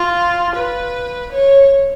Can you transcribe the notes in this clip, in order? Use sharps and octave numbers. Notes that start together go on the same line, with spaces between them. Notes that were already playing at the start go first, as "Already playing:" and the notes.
Already playing: F4
B4
C#5